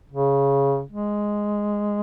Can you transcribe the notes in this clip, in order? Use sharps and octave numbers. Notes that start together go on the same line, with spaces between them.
C#3
G#3